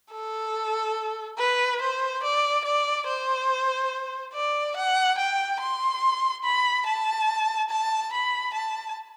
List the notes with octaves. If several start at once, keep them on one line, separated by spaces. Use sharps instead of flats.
A4
B4
C5
D5
D5
C5
D5
F#5
G5
C6
B5
A5
A5
B5
A5